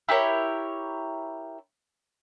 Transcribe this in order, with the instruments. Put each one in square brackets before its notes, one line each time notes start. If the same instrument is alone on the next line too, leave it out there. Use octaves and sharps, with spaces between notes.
[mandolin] E4 G4 A#4 C#5